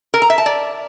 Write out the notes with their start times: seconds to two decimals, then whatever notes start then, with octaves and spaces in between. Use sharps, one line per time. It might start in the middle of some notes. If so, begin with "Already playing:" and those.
0.14 A#4
0.22 A#5
0.30 E5
0.38 A5
0.46 D5